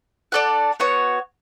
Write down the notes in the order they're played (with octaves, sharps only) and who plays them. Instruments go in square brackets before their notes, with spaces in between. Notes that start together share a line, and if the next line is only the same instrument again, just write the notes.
[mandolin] D4 A4 D5 F#5
B3 F#4 C#5 F#5